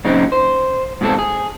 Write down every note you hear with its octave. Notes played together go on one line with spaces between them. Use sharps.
A#2 C#3 F#3 C4 D#4
C5
G#2 B2 C4 G#4 A4
G#4